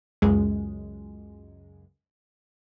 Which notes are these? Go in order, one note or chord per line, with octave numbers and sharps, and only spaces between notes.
C#2 F#2 G#3